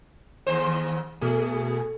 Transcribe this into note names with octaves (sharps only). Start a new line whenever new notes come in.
D#2 C5
B2 A3 G#4